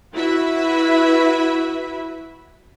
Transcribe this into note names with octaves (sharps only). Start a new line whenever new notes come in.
E4 F#4 B4 E5 B5